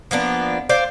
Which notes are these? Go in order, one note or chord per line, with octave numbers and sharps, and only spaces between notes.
F3 A#3 B3 D4
C5 D5 F5